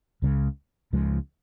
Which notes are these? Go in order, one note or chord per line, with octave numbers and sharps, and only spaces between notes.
C#2 C#3 F3 G#3
C#2 C#3 F3 G#3